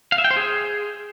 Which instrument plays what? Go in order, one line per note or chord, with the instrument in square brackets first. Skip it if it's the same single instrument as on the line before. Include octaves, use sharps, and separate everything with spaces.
[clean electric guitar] F5
E5
G5
C5
G#4